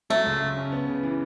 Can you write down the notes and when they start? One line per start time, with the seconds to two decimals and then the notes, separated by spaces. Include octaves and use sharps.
0.10 F#3 A3
0.26 C#2
0.42 C#2
0.57 C#4
0.72 B3
0.89 C#3
1.03 E3